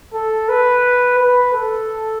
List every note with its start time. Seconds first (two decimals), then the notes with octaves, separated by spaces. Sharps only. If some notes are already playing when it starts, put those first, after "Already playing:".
0.14 A4
0.49 B4
1.19 B4
1.54 A4